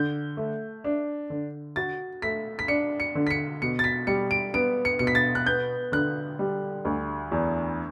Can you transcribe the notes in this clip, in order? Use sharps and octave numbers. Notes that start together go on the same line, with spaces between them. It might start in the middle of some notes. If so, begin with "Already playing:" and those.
Already playing: D3 G6
A3
D4
D3
F#4 A6
A3 B6
B6
D4 C#7
C#7
D3
B6
C#7
B2 C#7
A6
B6
G3 C#7
D7
B3 D7
C#7
B2 C#7
B6
A6
F#6
B3 G6
D3 F#6
G3
D2
E2